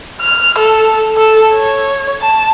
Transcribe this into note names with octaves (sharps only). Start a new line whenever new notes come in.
F6
A4
A4
C#5
A5